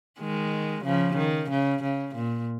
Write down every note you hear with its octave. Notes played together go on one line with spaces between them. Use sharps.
D#3 G#3
C#3 F3
D#3
C#3
C#3
A#2